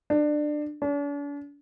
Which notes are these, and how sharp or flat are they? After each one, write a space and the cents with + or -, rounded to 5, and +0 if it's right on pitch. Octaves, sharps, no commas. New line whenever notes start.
D4 +20
D4 -45